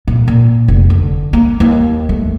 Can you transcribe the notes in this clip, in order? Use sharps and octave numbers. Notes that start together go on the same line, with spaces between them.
A#2
A#2
F1
D3
A#3
D#2
A3